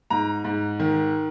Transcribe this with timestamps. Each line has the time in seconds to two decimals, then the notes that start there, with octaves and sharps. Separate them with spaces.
0.10 G#2 A#5
0.44 G#2
0.80 D#3